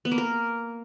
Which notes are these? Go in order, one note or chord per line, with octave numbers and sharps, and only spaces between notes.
B3
A#3
A#4